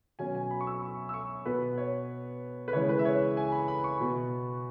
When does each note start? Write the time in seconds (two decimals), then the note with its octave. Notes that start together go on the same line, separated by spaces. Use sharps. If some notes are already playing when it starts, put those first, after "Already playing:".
0.19 B2 F#3 C#4 G#5
0.35 G#5
0.51 B5
0.61 C#6
0.67 E6
0.82 C#6
1.09 E6
1.14 C#6
1.45 B2 B3 B4
1.78 C#5
2.68 B4
2.73 C#3 E3 G#3 C#5
2.89 B4
2.99 E5
3.05 C#5
3.37 G#5
3.52 B5
3.68 B5
3.84 C#6
4.00 B2 B3